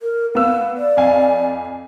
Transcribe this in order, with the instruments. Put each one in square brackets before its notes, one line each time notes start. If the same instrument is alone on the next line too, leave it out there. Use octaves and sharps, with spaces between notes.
[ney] A#4
[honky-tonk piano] B3 E6 [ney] F5
[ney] D5
[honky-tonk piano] F2 F5 G#5